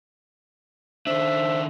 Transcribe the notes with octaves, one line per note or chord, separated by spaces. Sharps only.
D#3 D4 C5 E5